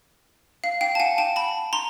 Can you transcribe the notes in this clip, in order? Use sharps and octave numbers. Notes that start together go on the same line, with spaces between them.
F5
F5 G5
A5
F#5 G#5
G5 A5
A5 B5
A#5 C6